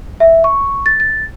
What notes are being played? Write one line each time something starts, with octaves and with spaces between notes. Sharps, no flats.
E5
C#6
A6
A6